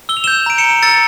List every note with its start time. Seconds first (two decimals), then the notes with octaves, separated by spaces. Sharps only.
0.09 E6 G7
0.17 F7
0.24 E7 G7
0.27 G6
0.46 A#5 D7
0.58 C#7 E7
0.64 A#5
0.83 E6 A6 C#7